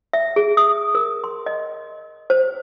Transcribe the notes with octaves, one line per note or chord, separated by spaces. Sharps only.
E5
G#4
D#6
A#4
C6
D#5
C5